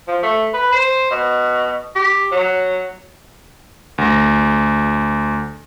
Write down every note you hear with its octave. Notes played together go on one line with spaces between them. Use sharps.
F3
A3
B4
C5
B2
G4
F#3
D2 A#6